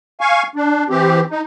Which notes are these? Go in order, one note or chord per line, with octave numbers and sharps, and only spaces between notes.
F5 G#5 C#6
D4
E3 C4 G4
D#4